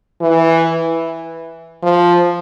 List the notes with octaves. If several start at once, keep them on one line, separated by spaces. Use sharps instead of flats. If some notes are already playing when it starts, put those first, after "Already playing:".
E3
F3